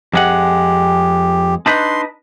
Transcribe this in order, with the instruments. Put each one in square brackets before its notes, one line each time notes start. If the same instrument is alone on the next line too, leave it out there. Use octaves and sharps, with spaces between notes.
[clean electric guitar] F2 G#3 F#5 [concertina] G4
[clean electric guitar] D4 D#4 B4 [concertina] C6